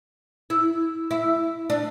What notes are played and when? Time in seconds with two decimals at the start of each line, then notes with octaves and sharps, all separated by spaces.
0.50 E4
1.11 E4
1.70 D4